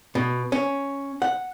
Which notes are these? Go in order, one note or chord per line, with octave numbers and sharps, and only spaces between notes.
B2
C#4
F#5